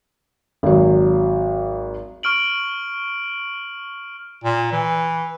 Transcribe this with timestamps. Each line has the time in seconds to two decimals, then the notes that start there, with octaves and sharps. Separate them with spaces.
0.63 G#1 F#3
2.23 C#6 F6 D7 F#7
4.44 A#2
4.72 E3